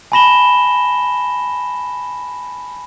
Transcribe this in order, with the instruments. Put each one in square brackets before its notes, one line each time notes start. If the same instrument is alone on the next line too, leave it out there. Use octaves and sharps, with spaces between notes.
[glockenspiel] G#5 A5 B5 A#6 E7 G7